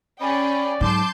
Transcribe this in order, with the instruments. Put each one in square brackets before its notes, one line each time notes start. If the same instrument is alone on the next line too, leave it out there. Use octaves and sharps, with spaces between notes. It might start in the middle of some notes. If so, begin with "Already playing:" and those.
[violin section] C#4 G#4 G5 [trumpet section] D5 [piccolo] B5
[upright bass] G#2 F#3 [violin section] A5 C6 G6 [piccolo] D6